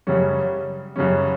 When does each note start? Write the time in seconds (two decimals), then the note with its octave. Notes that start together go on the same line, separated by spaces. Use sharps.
0.07 F#2 C#3 G3 C#4
0.96 F#2 C#3 G3 C#4